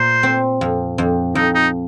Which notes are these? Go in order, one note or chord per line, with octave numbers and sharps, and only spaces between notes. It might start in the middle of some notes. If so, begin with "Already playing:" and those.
Already playing: A#2 C5
C4
F2
F2
F2 D#4
D#4